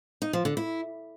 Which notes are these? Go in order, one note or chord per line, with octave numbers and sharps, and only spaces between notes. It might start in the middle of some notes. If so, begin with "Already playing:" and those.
D#4
F3
D3
E4